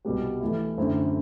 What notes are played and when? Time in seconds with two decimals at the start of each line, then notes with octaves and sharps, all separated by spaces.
0.05 C2 B2 G3 B3 F#4
0.41 E3 A3 E4
0.78 F#2 D3 A3 C4 E4